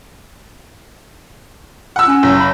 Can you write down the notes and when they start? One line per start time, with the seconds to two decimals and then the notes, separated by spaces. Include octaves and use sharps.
1.96 F#5 E6
2.08 C#4
2.23 F#1
2.40 B5